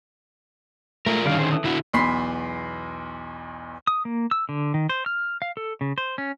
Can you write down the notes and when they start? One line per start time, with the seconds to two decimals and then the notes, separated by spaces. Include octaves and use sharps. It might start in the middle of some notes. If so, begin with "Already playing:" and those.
1.06 G#3 A3 F4 A#4
1.25 D3 D#3 G3 C#4 D5 F5
1.39 G#4 C5
1.52 E3 A4 D#6
1.64 D3 B3 E4 F#4
1.93 B1 E2 B5 C6 B6 C7
3.87 D#6
4.05 A#3
4.31 E6
4.49 D3
4.74 D#3
4.89 C5
5.06 F6
5.42 F5
5.57 A4
5.81 C#3
5.98 C5
6.18 C#4